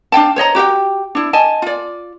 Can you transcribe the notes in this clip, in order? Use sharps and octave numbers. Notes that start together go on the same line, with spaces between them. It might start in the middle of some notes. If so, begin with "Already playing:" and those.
D4 F5 G5 A5
C5 C#5 D#5 A#5
F#4 G4 E5 G5
D4 E4
D#5 G#5 A5
F4 D5